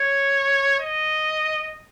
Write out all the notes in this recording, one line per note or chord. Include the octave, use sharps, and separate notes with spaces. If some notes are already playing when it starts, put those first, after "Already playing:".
Already playing: C#5
D#5